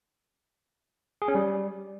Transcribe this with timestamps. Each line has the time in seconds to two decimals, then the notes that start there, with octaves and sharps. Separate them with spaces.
1.22 G#4
1.28 C#4
1.35 G3